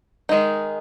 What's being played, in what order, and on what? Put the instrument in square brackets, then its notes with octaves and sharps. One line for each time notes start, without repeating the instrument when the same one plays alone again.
[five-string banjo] D#3 G#3 D#4